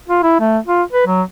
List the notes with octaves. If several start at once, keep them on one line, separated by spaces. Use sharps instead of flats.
F4
E4
A3
F4
B4
F#3